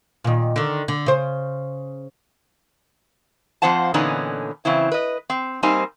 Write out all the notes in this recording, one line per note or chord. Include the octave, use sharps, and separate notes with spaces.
A#2 D#3
D3 D#3
D3
C#3 C5
F2 F3 C4 C5 F#5 A5
A#2 D3 E3 B3 C#4 D#4
C#3 E3 C4 E4
B4 D#5
C4
G3 A#3 C4 D#4 C5 G#5